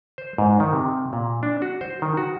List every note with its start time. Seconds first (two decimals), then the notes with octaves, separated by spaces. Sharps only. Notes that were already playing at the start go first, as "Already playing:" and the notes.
0.18 C5
0.38 G#2
0.60 D#3
0.73 C3
1.13 A#2
1.43 D4
1.62 F#4
1.81 C5
2.02 D#3
2.17 F#4